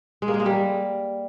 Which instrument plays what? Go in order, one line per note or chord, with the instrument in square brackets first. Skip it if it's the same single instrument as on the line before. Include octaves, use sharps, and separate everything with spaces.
[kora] G#3
A#3
G#3
A#3
G3